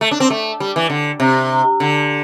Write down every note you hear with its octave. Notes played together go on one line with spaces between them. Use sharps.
A3
D4
C4
A3
G3
E3
D3
C3
D3